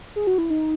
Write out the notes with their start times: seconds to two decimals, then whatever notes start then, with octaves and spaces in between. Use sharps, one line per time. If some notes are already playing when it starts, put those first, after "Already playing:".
0.16 G#4
0.27 F#4
0.38 E4
0.50 D#4